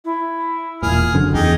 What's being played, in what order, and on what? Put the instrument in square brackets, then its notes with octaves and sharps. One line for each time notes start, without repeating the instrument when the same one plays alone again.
[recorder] E4
[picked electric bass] E1 A#2 [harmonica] G#4 F6
[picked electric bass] F#1 F#2 D3
[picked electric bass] E2 [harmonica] D#4 G4 [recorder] G#4